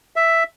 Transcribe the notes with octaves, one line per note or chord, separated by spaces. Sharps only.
E5